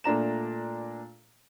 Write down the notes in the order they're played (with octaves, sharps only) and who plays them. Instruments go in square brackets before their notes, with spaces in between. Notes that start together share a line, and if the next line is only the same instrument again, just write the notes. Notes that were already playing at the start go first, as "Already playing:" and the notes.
[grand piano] A#2 A3 D4 A#5 E7